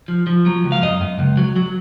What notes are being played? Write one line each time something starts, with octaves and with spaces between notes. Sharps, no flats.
F3
F3
F#3
C#2
F5
F#2 D#5
F#2
C#2
F#3
F#3